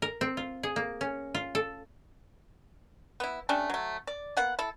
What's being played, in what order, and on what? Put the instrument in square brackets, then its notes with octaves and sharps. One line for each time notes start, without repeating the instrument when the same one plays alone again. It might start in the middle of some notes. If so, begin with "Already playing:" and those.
[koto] A#4
C4
F4
G#4
A#3
C#4
F4
A4
[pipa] B3 E4
G3 A3 C#4 D4
F#3 A3
D5
A#3 B3 F#5
E4 A4